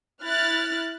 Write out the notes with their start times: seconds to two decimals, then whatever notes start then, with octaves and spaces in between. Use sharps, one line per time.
0.22 E4 F6 F#6 A6